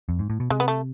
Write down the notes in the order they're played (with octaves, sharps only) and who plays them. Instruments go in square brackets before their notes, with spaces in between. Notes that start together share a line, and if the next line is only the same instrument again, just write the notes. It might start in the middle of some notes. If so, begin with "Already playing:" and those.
[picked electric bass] F2
G#2
A2
B2
[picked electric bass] C3 [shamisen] G#3
[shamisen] B3
A3